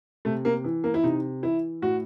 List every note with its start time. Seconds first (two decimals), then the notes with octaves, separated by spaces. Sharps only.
0.25 C3 A3
0.45 A#3
0.64 E3
0.84 A#3
0.94 E4
1.03 C3 D#4
1.43 E3 E4
1.82 A2 F#4